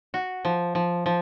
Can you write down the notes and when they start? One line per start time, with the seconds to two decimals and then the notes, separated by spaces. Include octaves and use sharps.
0.14 F#4
0.45 F3
0.75 F3
1.06 F3